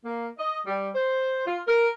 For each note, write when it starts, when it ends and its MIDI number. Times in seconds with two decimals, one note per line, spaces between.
0.05 0.28 58
0.39 0.60 75
0.67 0.89 55
0.95 1.42 72
1.47 1.59 65
1.67 1.88 70